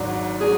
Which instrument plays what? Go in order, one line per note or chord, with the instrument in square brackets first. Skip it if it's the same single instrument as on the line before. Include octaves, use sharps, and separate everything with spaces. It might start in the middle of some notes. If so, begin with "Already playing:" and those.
Already playing: [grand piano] G#1 G#2 F#3 D4
[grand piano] F#3 D4 [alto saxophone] G#4